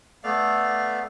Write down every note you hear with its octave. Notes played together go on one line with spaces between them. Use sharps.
A3 B3 D5 F5